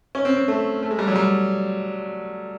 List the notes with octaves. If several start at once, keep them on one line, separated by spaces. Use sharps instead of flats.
C#4
C4
C4
A3
A3
G#3
G3
F#3
G3